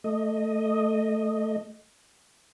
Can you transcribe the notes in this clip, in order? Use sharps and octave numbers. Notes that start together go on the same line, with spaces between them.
A3 D#5